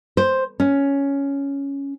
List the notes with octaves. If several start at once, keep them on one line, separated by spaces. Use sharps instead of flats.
C5
C#4